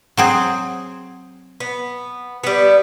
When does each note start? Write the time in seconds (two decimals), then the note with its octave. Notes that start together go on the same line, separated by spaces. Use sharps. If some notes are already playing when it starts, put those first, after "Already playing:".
0.17 F#3 C4 G#4
1.60 B3
2.44 G3 B3